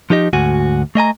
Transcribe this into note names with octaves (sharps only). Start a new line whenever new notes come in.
F3 D#4 G4 D#5
D2 G#2 F#4 G#5
A3 D#5 G#5 A#5